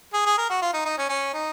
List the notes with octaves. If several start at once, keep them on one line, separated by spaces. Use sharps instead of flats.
G#4
G#4
A#4
F#4
F4
D#4
D#4
C#4
C#4
D#4